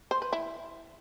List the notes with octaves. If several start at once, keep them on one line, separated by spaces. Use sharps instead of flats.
C5
B4
E4